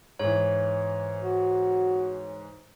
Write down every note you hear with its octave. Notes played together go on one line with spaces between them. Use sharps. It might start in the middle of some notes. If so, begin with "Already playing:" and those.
G#2 E3 C#5
F#4